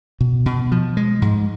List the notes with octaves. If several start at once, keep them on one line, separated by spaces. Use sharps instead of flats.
B2
B2
F3
G#3
G#2